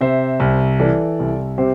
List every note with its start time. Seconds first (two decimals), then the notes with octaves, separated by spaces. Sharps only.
0.01 C3 C5 E5
0.40 C2
0.80 E3 A4 D5
1.19 C2
1.58 C3 G4 C5